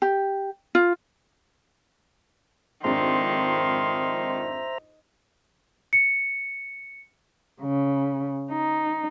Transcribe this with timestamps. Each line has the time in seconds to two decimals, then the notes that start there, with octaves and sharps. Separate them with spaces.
0.02 G4
0.75 F4
2.84 F2 G#2 D#3 D4 C5 E5 A#5 C6
5.93 C#7
7.61 C#3
8.52 D#4